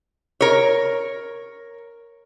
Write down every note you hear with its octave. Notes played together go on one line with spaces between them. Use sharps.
A#4 C#5